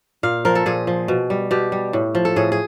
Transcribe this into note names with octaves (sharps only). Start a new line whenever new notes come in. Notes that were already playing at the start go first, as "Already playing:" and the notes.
A#2 F5
F3 A#4
A4
A#2 G#4
F3
B2
G3
B2 G4
G3
A2
F3
A4
A2 G#4
G#4